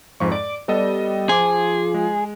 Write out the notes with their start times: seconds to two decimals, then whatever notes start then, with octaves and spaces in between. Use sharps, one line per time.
0.20 F2 G#2 F3 C#6
0.32 D5 D6
0.68 G3 B3 A4 D#5
1.29 F3 G#4 C6 D6
1.94 G#3